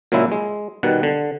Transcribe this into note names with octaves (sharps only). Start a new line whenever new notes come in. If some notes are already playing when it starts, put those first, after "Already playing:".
A#2 C#3 F#3 G#3 E4
G#3
B2 D#3 G3 F#5
D3